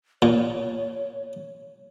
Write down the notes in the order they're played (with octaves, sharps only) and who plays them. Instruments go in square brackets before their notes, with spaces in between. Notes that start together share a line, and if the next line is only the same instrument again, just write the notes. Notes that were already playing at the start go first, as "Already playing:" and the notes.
[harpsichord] A#2 [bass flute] C#5